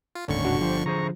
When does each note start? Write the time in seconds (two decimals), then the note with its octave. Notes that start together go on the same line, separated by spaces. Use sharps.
0.15 F4
0.28 G1 D#2 A2 D3 C#4 C#6
0.45 A#2 D4 F#4
0.61 F3 G4 C5
0.86 D3 G#4 C5 A#5 C#6